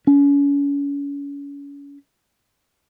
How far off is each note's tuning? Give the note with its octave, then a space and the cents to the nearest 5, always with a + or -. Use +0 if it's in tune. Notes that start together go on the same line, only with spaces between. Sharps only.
C#4 +35